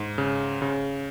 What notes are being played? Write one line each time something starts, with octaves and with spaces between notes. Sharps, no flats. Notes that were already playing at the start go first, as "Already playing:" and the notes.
Already playing: G#2
C#3
C#3